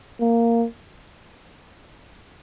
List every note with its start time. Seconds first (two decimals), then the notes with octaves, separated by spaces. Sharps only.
0.20 A#3